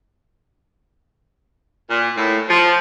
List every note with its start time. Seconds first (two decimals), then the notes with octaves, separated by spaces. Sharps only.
1.90 A#2
2.16 A2
2.49 F3